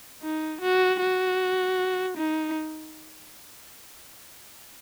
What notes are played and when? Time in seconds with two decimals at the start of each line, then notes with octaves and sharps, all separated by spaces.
0.23 D#4
0.62 F#4
1.01 F#4
2.17 D#4